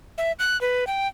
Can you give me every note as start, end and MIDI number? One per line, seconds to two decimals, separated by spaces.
0.18 0.32 76
0.39 0.59 90
0.61 0.87 71
0.87 1.08 79